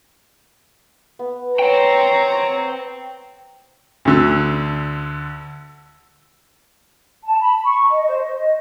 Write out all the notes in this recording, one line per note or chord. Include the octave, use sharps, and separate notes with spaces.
B3
C5 C#5 G5 A#5
D2 D3 E6
A5
B5
C#6
D#5
C5
D#5